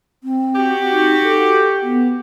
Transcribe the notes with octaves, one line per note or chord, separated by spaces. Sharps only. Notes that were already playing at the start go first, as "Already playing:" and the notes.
C4
F#4 G4
D#4
A4
B3